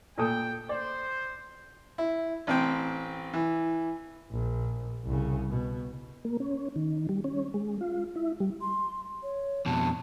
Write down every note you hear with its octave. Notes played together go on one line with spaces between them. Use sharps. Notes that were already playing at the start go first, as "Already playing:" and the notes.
A#2 A4 G5 D#6
C5 D5
E4
A1 C4 G5
E3
A#1
C2 C#3
B2
A#3
C#4
D#3
G3
C#4
G#3
F4
E4
G3
C6
C#5
F2 B2 A5